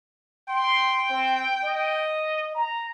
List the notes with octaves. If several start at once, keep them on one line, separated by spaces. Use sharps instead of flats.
G5 C6
C4
D#5
A#5